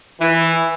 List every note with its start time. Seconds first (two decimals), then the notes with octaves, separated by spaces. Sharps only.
0.21 E3